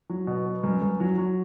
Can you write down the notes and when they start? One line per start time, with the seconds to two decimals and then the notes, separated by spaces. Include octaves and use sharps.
0.09 F#3
0.27 B2
0.46 B3
0.63 F#2
0.82 F#2
1.00 F#3
1.18 F#3